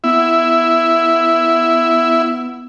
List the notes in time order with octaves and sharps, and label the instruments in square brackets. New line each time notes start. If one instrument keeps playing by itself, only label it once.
[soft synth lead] B3 [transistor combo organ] E4